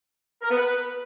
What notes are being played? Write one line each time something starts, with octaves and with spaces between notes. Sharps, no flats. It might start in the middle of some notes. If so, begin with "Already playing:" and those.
A#4
B3
B4